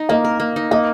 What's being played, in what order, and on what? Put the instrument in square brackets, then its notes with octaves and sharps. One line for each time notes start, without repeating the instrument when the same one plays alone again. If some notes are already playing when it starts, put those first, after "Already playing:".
Already playing: [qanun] D#4
[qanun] A#3 [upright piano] D#5
[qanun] A#4
A#3
D#4
[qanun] A#3 [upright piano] D#5